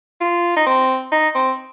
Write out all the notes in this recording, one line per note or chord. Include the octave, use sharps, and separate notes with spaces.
F4
D#4
C4
D#4
C4